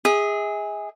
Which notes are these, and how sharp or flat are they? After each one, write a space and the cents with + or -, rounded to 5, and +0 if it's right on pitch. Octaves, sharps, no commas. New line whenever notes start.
G#4 -15 E5 -45